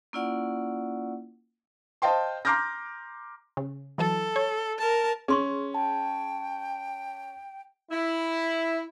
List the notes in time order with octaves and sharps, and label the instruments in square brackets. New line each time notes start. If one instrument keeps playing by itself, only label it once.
[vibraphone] A#3 C#4 E4 F4 D5 F#5
[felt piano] C5 D#5 F5 G5 A5 C6
A#5 C6 D6 F6 G6 A#6
[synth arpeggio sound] C#3
[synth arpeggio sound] E3 F#3 A5 [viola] A4
[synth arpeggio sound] C#5
[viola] A#4 A5
[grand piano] C#4 [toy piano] G#4 C6 C#6
[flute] G5 [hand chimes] A5
[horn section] E4